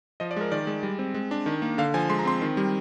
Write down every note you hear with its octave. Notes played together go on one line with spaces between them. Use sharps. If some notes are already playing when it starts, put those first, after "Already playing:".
F3 D#5
D5
G#3 A#4
D#3 D5
G#3
G3
C4
G#3
D4
D#3
A#3
D3 F5
F3 G#5
G#3 C6
A#5
C4 C6
D#3
G3